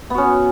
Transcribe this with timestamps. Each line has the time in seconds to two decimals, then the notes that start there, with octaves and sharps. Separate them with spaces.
0.10 B3
0.14 F#4
0.18 C#4